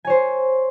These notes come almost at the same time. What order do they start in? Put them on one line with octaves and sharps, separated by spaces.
G#5 C#5 C5